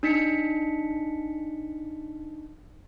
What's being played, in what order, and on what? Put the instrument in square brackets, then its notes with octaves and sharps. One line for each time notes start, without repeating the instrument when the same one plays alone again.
[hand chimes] D4 D#4 B6 C#7